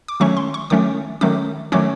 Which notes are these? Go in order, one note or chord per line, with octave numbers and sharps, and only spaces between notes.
D6
D#3 F#3 A3 C#4 C#6
C6
C#6
D#3 F#3 A3 C#4 D6
D#3 F#3 A3 C#4 D6
D#3 F#3 A3 C#4 D6